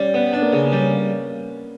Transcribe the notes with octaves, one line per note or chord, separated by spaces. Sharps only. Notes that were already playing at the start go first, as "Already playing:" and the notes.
Already playing: G3 C#4
B3
D4
A#3
C#3 B3
G3 C#4